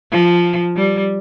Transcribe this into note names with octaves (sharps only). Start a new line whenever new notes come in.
F3
G3